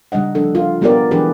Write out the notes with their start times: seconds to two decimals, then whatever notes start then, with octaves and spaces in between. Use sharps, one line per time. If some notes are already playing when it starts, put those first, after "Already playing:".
0.12 C#3 G3 D4 D#5 F#5
0.35 F3 D4 A4
0.55 F4
0.81 G3 B3 F4 G4 A#4 D5
1.11 E3 F#3 D4 G4 G#4 B4